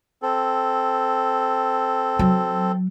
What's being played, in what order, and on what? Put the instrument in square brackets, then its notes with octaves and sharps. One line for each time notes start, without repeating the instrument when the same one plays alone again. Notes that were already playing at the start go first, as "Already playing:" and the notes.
[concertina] C4 A4
[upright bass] F#3